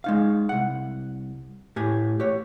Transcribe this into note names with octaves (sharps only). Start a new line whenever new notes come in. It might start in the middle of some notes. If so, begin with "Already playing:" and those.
G#3 D#4 F5
C2 F#5
A2 G4 G#5
G4 C#5